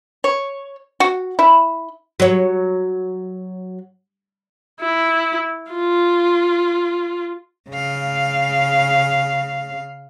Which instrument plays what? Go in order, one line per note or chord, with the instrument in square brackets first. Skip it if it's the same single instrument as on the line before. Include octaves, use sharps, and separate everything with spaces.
[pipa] C#5
F#4
E4
[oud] F#3 C#5
[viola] E4
F4
[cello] C#3 F5